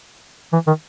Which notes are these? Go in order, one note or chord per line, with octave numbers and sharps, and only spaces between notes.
E3
D#3